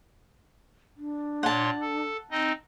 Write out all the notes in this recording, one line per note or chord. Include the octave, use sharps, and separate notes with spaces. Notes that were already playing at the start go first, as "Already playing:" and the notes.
D4
A#2 C#5 F#5 A5 C6
A4
C4 D#4 D#5